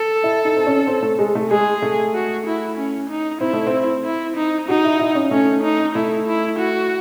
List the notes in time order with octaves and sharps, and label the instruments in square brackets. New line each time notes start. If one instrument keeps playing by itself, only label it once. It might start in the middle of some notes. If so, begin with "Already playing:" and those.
Already playing: [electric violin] A4
[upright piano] E4
D#4
C4
C#4
C4
A3
G#3
A3
[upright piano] G#3 [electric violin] G#4
[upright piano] A3
[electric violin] F#4
E4
C#4
D#4
[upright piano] C4 [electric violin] E4
[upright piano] A3
C4
[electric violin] E4
D#4
[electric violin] D#4 [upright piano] F#4
[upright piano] E4
E4
C#4
[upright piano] A3 [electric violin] C#4
[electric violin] D#4
[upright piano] A3 [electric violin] E4
[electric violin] E4
F#4